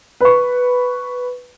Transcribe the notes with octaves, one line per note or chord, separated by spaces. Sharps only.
B4 C#6